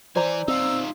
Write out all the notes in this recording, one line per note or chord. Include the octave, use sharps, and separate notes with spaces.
E3 C5 D5 G#5 A#5
C4 D#4 F4 E6